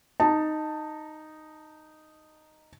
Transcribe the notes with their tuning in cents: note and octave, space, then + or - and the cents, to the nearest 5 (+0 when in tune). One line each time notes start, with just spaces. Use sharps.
D#4 -5 A5 +15